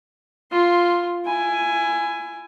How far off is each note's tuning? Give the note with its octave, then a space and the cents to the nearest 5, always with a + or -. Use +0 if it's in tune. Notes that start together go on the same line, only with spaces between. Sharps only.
F4 +0 C6 +10
E4 +30 G#5 +0